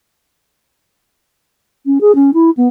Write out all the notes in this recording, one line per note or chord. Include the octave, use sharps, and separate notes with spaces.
C#4
G#4
C#4
E4
B3